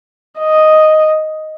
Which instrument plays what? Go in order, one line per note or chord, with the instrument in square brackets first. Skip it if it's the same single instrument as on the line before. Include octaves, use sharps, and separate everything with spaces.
[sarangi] D#5